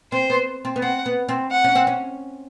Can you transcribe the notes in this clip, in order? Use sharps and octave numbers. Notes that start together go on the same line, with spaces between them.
C4 C5
B3
C4
B3
C4 F#5
B3
C4
F#5
C#4
C4
C#4